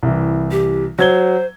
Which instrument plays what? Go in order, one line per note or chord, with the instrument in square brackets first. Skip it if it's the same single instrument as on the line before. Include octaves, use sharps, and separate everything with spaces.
[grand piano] C2 E3
[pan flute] G4
[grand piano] F#3 G#6 G7 [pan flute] C5